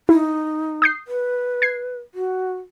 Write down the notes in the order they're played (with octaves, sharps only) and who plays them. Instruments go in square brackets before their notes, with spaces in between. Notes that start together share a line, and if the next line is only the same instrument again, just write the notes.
[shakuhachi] D#4 [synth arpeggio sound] E4
[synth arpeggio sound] D#6 G6 C7
[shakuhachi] B4
[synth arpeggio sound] G#6 C7
[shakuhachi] F#4